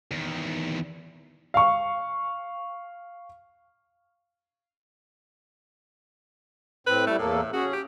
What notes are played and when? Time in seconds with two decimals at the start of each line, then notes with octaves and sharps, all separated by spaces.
0.11 E2 D#3
1.54 F5 C#6
6.87 A2 C4 B4
7.07 G3 A3 E4
7.19 E2 A2 A#3 A4
7.53 C#4 F#4 G#4
7.73 G4